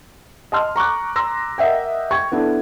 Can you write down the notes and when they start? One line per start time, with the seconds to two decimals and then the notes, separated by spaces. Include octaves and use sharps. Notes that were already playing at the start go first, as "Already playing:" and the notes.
0.52 D#5 A5 C6 F6
0.76 A#5 C#6 D6 F#6
1.16 A#5 C6 E6 A#6
1.58 A#4 D#5 E5 F#5 G5
2.11 G5 C#6 G#6
2.32 B3 D4 E4 A4